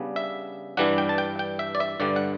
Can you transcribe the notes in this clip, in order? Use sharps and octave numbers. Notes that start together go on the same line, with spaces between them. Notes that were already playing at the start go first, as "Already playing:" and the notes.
Already playing: C#3 G3 B3 D4
E5
G2 E3 G3 D4 F#5
G5
A5
G5
G5
E5
D5
E5
G2 D3 G3 D5
F#5